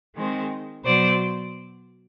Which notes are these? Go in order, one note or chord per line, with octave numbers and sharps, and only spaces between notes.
D#3 G#3 C4
B2 F#3 C5 D5